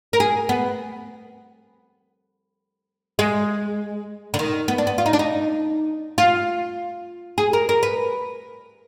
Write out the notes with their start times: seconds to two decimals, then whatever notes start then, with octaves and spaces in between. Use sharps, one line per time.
0.13 A#4
0.20 G#4
0.49 B3
3.19 G#3
4.34 D3
4.39 D#3
4.68 B3
4.78 D4
4.87 B3
4.98 F4
5.06 D#4
5.13 D4
5.19 D#4
6.18 F4
7.38 G#4
7.53 A#4
7.69 A#4
7.83 B4